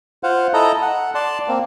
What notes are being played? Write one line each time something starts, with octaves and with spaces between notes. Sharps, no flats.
F4 C5 F5 F#5
E4 A4 D#5 A#5
F#5
D5 A5 C6
A#3 C4